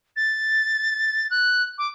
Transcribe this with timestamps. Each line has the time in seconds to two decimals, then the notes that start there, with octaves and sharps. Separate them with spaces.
0.16 A6
1.30 F#6
1.78 D6